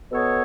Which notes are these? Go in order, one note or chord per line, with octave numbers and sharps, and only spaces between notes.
B2 B3 A4 C#5